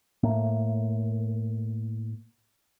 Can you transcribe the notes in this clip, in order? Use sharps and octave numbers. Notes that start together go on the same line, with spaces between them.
A2 A3 A#3